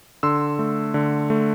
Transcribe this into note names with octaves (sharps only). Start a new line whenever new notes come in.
D3 C6 E6
A3
D3
A3